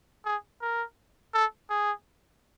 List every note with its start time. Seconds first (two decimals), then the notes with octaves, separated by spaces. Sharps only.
0.25 G#4
0.62 A#4
1.34 A4
1.70 G#4